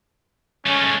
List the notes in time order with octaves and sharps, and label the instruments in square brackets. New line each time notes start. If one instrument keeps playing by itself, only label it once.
[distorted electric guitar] G#3 A3 [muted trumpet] C#4